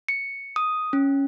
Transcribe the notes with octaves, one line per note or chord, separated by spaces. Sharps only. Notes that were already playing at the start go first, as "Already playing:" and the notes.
C#7
D#6
C#4